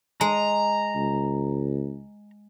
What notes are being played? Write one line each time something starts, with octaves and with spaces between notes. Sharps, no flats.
G#3 A#5
C#2